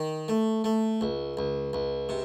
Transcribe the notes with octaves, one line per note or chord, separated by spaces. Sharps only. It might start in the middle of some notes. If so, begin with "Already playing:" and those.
Already playing: D#3
A3
A3
C#2
C#2
C#2
C3